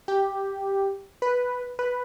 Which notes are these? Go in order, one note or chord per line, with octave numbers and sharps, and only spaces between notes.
G4
B4
B4